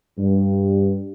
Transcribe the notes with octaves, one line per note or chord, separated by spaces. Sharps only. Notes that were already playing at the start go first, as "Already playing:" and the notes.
G2